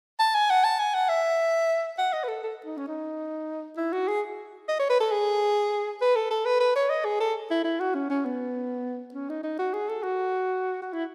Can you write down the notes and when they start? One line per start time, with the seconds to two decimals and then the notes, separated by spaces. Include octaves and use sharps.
0.19 A5
0.34 G#5
0.50 F#5
0.64 A5
0.79 G#5
0.94 F#5
1.09 E5
1.98 F#5
2.13 D#5
2.24 B4
2.28 A4
2.43 A4
2.65 D#4
2.77 C#4
2.88 D#4
3.77 E4
3.92 F#4
4.07 G#4
4.68 D#5
4.79 C#5
4.90 B4
5.00 A4
5.12 G#4
6.01 B4
6.16 A4
6.31 A4
6.45 B4
6.60 B4
6.76 C#5
6.90 D#5
7.05 G#4
7.20 A4
7.50 E4
7.64 E4
7.80 F#4
7.94 C#4
8.10 C#4
8.25 B3
9.14 C#4
9.29 D#4
9.43 D#4
9.59 F#4
9.73 G#4
9.89 A4
10.03 F#4
10.82 F#4
10.93 E4